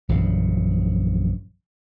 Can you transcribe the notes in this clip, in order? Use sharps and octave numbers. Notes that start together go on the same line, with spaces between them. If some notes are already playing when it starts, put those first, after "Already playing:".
A#1 F#2 C#3 E3